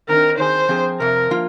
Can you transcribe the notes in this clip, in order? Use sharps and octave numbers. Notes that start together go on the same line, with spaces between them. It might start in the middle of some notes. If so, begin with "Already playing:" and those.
D#3 C4 D#4 A#4
D#3 C4 G#4 C5
F3 C4 G#4
F2 C3 A#4
F3 A#3 F4